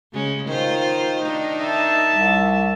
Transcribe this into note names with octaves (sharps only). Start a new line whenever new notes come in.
C#3 G#3 C#4
D#3 F4 C5
D4 D#4
E5 A5
C2